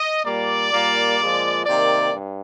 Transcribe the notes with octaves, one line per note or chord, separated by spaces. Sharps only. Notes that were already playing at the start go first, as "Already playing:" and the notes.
Already playing: D#5
A#2 G3 A#3 D5
A#2 G3 A#3
A#2 F3 G#3
C3 D#3 A#3 D5
G2